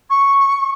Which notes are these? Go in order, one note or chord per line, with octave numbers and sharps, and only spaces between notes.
C#6